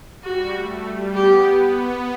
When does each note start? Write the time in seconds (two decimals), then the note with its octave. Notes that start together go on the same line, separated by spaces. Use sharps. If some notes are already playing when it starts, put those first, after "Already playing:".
0.23 G3 F#4
0.54 A3
0.85 G3
1.15 B3 G4
1.60 B3